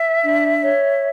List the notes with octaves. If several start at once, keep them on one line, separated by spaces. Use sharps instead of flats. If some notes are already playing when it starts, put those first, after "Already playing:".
Already playing: E5
D4
C#5